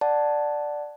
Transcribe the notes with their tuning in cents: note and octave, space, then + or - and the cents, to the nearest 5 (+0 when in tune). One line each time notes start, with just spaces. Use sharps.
D5 +5 F#5 -5 A5 +0